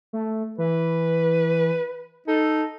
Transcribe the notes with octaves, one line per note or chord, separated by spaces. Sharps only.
A3
E3 B4
D#4 A4